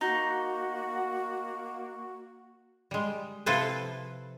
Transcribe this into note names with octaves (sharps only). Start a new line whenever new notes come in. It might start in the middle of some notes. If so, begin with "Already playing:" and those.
A#3 D#4 F#4
G3 G#3
C3 F3 E4 A4 B4 C5